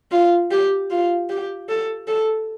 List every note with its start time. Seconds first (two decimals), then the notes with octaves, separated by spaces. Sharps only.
0.12 F4
0.51 G4
0.90 F4
1.29 G4
1.69 A4
2.08 A4